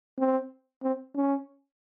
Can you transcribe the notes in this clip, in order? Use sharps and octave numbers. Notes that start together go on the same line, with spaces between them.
C4
C4
C#4